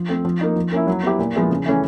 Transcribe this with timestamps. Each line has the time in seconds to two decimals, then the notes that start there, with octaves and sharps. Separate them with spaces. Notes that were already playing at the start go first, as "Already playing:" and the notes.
Already playing: F3
0.09 A3 C4
0.25 F3
0.41 A#3 D#4
0.56 F3
0.72 A#3 C#4 E4
0.87 F#3
1.03 B3 E4 G4
1.19 A#2
1.35 F3 G#3 B3 E4
1.51 C#3
1.66 E3 A3 C#4